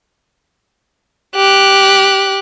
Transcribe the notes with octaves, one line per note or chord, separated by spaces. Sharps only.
G4 F#6